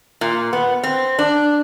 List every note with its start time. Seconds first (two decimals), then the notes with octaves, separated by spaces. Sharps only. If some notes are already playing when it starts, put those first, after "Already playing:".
0.21 A#2
0.53 B3
0.84 C4
1.19 D4